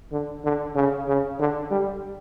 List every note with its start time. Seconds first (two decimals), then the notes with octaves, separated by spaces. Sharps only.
0.12 D3
0.44 D3
0.75 C#3
1.08 C#3
1.40 D3
1.71 G3